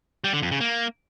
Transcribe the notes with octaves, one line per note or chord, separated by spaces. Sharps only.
G3
D3
F2
C#3
A#3